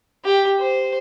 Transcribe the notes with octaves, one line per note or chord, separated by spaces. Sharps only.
G4
C5